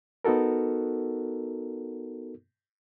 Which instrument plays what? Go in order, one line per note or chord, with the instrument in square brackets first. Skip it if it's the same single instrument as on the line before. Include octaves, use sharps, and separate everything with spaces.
[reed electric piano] B3 D#4 F#4 A4 A#4